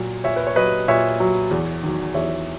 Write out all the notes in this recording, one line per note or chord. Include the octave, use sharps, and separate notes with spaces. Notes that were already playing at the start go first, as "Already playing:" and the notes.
Already playing: A#2 F#3
A#2 C#5 E5
B4
C#5
F#3 B4 D#5
A#2 C#5 E5
F#3
E2
D#3 F#3
E2 C#5 E5